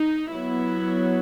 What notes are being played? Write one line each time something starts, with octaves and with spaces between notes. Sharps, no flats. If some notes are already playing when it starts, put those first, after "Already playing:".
Already playing: D#4
F#3 B3 E4